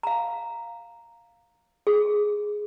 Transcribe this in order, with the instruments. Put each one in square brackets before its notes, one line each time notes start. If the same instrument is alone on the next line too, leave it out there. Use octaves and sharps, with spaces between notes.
[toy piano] F5 A#5
G#4